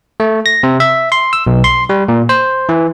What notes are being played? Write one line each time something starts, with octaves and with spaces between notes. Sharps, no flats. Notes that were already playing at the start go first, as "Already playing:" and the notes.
A3
A#6
C3
E5
C6
E6
B1
C6
G3
A#2
C5
E3